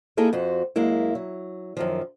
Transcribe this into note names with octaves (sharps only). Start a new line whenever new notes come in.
A#3 D#4 E4 G#4 A4
F2 F#4 C5
F#2 G#3 A#3 E4
F#3
F#2 D#3 F3